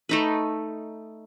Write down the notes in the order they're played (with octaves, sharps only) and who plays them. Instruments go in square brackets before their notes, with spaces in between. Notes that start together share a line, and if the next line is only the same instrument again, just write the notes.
[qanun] A3 D#4 B4